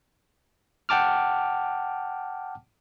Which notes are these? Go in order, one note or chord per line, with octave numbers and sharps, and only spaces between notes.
F#5 G5 A5 D6 F6